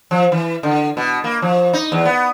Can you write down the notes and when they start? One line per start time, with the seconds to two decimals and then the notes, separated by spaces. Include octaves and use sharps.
0.11 F3
0.32 E3
0.63 D3
0.97 B2
1.24 A#3
1.42 F3
1.73 D#4
1.92 E2
2.05 B3